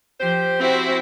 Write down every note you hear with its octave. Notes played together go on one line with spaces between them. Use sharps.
F3 G4 C5
C4 E4 F#4